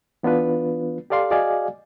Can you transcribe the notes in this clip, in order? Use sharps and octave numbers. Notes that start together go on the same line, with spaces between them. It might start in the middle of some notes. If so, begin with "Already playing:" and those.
E3 B3 D4 F4 B4
G4 A4 D5 F5 C6
F#4 G#4 D5 D#5 F5 G#5